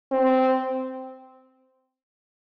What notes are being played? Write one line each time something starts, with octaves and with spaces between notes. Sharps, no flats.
C4